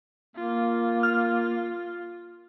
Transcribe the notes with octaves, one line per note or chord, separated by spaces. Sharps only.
A#3 F4
F6